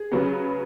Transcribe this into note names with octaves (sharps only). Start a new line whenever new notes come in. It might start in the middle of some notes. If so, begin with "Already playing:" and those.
Already playing: G#4
C#3 F#3 B3